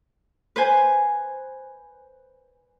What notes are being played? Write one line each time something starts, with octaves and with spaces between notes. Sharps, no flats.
B4 C5 G#5